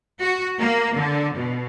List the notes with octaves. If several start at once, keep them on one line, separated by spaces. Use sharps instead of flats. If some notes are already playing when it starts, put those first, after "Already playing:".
F#4
A#3
D3
B2